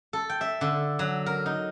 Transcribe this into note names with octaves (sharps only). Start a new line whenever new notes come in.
A4
G5
E5
D3
F#3
A#4
D#4